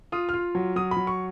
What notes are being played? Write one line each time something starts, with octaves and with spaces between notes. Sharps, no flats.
F4 D#6
F4 F6
F#3
F#3 D#6
B5
F#3
C#6